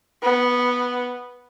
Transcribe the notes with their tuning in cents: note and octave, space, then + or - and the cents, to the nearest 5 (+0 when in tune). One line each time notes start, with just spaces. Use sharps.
B3 -5